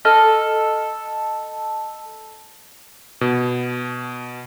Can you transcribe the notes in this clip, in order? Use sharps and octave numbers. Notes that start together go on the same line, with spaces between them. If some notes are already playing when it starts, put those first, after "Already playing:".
A4 D#5 F6
B2